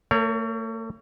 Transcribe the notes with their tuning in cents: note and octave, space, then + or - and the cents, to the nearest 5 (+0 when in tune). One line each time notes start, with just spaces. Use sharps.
A3 +40 A#4 +0 C#5 +15